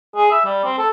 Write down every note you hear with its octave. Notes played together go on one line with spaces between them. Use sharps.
G#4
E5
G3
C4
A4